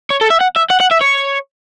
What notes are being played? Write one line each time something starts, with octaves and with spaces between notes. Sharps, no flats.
C#5
A4
E5
F#5
E5
F#5
F#5
E5
C#5